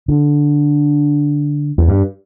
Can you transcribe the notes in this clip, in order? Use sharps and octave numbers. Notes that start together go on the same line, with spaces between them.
D3
E2
G2